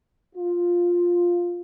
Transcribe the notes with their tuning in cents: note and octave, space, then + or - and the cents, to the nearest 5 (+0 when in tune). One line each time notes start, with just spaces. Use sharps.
F4 +5